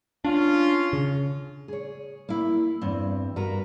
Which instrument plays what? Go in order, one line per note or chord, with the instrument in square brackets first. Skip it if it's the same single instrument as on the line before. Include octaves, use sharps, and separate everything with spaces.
[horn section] C#4 F4 [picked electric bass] D4
[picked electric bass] C#3
[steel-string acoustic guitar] G#4 C#5
A#3 E4
E2 G2 C4
G2 F#4 A#4 B4 A#5